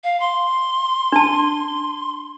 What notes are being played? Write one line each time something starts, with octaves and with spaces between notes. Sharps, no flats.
F5
C6
D4 A5